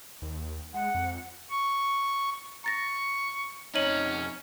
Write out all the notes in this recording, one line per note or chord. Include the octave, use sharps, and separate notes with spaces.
D#2
G#3 F#5
F2
C#6
A#5 C#6 A6 A#6
F2 C#4 D#4 C#5 D#7 F#7